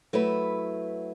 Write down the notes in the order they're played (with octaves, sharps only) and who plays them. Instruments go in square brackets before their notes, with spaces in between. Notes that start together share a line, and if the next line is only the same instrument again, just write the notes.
[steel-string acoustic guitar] F#3 A3 E4 B4